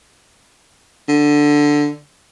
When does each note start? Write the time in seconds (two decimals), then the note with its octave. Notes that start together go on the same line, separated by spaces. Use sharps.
1.08 D3